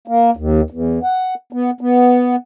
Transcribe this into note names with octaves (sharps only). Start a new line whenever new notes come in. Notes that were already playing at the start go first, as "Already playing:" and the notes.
A#3
D#2
E2
F#5
B3
B3